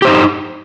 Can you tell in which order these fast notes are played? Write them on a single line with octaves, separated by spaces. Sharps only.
G4 C5 D#4